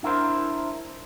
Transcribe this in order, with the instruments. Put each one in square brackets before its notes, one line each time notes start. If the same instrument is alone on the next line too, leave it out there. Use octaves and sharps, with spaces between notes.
[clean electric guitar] D4 E4 A#4 C5